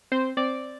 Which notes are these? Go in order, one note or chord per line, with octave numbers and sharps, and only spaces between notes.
C4 C5
C4 D5